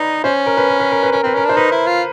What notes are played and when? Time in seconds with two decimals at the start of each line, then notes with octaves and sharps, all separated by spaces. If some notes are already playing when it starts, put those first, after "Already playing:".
Already playing: D#4 B4 D5
0.24 C#4 C5
0.46 A#4
0.57 B4
0.69 A#4
0.80 B4
0.92 A#4
1.03 B4
1.12 C#4 A#4
1.23 C4 B4
1.34 C#4 A#4
1.45 D4 C5
1.56 D#4 B4
1.72 E4
1.87 F4